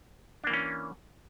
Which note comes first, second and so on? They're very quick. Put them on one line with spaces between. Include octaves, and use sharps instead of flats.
D4 A#3 E3 C#4